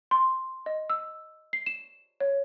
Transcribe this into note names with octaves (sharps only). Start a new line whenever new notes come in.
C6
D#5
E6
C7
E7
C#5